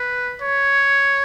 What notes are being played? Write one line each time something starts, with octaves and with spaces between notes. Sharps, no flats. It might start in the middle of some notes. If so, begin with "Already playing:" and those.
Already playing: B4
C#5